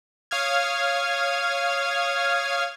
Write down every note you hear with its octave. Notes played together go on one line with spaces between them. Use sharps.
C#5 F5 D#6 F6 G#6